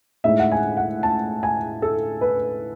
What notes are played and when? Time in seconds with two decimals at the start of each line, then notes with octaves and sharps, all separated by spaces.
0.24 A2 G#3 D#4 E5
0.39 F#5
0.52 G#5
0.77 F#5
1.03 A5
1.43 G#5
1.82 A4
2.21 B4